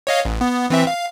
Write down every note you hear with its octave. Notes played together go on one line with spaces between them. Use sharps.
C#5 D#5 F5
A1
B3
E3 C4 E5
F5